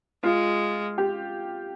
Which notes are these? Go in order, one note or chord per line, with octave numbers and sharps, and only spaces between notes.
G#3 F4
G4